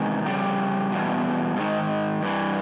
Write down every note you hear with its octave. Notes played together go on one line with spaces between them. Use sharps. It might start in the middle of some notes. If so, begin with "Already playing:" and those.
Already playing: E2 C3 D#3 G#3
F2 C#3 G3
E2 B2
G#2 D#3
G2 E3